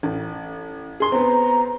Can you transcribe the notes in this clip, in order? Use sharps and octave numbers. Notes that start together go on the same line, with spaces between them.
A1
G#4 C6
B3 C4 A#5